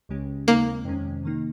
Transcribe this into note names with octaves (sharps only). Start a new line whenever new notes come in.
C#2 C#3 G#3 C#4 G4
D#2 C#3 G#3 A#3 C4 D#4
F2 C3 D#3 G#3 C#4
C3 D#3 A#3 D#4